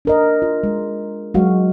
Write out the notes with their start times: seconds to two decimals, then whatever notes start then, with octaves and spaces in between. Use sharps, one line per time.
0.05 D4 A#4 D#5
0.42 F4
0.63 G#3
1.34 F#3 G#3 F#4 F5